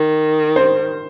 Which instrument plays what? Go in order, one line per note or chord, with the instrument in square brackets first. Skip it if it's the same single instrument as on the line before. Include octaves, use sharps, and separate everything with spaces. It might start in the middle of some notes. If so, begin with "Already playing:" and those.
Already playing: [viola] D#3
[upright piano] C5